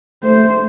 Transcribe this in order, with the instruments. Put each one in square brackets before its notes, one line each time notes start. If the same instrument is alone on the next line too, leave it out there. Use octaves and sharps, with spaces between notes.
[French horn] A3 [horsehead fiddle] C5